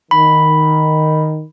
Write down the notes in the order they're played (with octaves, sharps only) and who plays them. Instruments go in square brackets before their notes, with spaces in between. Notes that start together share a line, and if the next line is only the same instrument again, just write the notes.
[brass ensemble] D#3 [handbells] B5